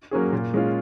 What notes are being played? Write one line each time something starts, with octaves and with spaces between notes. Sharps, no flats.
F#3 A#3 C#4 G#4
A#2
G#3 C#4 F4